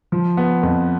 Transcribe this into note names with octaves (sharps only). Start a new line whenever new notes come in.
F3
B3
F2